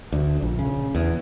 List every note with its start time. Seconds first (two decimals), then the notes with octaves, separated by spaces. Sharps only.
0.12 D2
0.42 A#1
0.59 C#3
0.95 E2